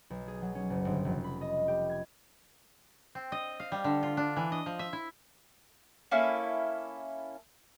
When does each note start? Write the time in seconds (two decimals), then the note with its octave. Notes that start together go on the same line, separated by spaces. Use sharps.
0.10 B1
0.28 G#4
0.42 F#3
0.55 C#4
0.70 F#1
0.85 G1
1.05 F1
1.24 B5
1.41 D#5
1.68 G4
1.90 G#6
3.15 C4
3.32 D#5
3.60 F5
3.72 G3
3.84 D3
4.03 F4
4.17 D4
4.37 E3
4.52 D#5
4.66 F3
4.79 E5
4.93 E4
6.11 A#3 C#4 E4 A4